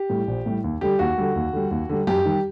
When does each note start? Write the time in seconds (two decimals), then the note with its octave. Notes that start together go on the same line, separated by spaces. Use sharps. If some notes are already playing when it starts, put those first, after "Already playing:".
Already playing: G4
0.10 A2 G3
0.28 A#1
0.46 A2 G3
0.64 D#2
0.81 D3 G3 G4
0.99 D#2 F#4
1.18 D3 G3
1.36 D#2
1.53 D3 G3
1.71 D#2
1.89 D3 G3
2.07 F#2 G4
2.25 D#3 G3